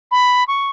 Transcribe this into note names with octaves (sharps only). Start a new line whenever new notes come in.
B5
C#6